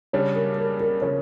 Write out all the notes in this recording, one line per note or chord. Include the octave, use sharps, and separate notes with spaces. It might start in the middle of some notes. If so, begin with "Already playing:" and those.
C#3 G3 D4 C#5
A#4
A#4
A#4
C#3 F3 C#4 C#5